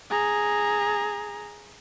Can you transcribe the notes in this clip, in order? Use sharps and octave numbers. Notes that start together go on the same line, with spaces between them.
G#4 A#5